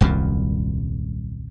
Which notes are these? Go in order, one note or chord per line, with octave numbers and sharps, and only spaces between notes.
D#1 C2 F#2 A#2